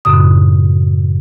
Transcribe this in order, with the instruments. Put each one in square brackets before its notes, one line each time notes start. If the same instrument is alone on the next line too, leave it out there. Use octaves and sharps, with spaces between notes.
[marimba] F#2 A2 C#3 D#6